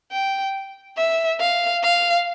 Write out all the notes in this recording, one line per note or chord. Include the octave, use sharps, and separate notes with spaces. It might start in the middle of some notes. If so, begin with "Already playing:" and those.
G5
E5
F5
F5